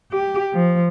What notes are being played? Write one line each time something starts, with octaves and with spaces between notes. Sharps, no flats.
G4
F3